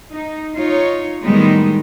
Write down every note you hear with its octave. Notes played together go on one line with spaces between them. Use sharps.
D#4
D#4 F4 C#5
A2 D#3 G3 G#3 B3 D#4